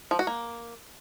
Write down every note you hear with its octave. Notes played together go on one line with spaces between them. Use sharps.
F3
F#4
A#3